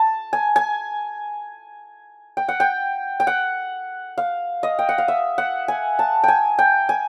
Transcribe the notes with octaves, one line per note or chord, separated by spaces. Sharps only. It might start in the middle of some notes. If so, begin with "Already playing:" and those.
Already playing: A5
G#5
G#5
G5
F#5
G5
G5
F#5
F5
D#5
G5
F#5
F5
E5
F#5
G#5
A5
G5 G#5
G5
G#5